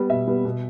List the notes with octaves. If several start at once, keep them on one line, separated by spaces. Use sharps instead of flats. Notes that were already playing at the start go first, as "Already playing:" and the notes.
Already playing: G3 B3
B2 E5
G3 B3
B2